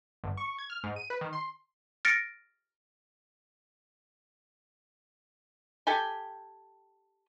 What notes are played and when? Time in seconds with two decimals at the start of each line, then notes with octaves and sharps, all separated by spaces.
0.24 G1
0.37 C#6
0.58 G#6
0.70 F6
0.84 G#2
0.96 D#7
1.10 B4
1.21 D#3
1.33 C6
2.05 F6 A6 A#6 C#7 D7
5.87 G4 A4 G5 G#5